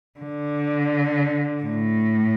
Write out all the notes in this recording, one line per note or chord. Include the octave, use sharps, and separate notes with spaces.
D3
A2